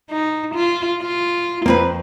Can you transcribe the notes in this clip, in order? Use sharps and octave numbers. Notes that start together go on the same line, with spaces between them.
D#4
F4
F4
F2 A#3 C4 B4